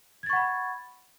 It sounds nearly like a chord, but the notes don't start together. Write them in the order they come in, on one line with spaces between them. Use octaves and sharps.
G#6 A6 C#6 F#5 B5